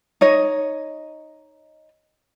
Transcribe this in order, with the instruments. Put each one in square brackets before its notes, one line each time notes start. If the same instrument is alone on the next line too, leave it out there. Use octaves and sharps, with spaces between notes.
[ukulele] D#4 C#5 D#5